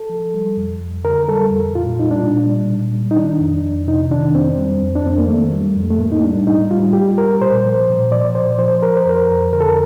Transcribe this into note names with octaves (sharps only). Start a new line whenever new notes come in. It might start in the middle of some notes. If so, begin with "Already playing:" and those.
Already playing: A4
F3
G3
F2
F2
D3 A#4
G3 A4
F2
A#2 F4
G3 D#4
D4
A#2
G3
A#2
G3
D#4
D#3 D4
F2
F2
C3 D#4
D#3 D4
F2 C4
G3
F2
D4
F2 C4
A#3
D#3 A3
G3
F2
A3
A2 A#3
D#4
G3 D4
A2 D#4
G3 F4
A2 G4
G3 A#4
A#2 C5
F3
A#2
F3 D5
A#2 C5
F3 C5
F3 A#4
C5
F2 A#4
F2
D3 A#4
A4
A#4